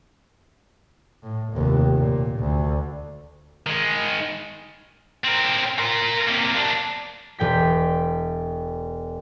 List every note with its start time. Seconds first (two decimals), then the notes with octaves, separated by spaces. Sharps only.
1.23 A2
1.53 F1 D#2
1.97 A#2
2.40 D2
3.66 D#3 G#3
5.25 C4 A#4
5.79 A#4 C6
6.28 C3 A#3
6.55 A#3 D4
7.39 E1 G5 B6